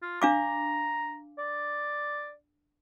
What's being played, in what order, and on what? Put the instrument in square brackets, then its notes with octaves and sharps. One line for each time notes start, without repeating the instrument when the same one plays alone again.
[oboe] F4
[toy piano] D4 F5 D6 [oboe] A#5
[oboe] D5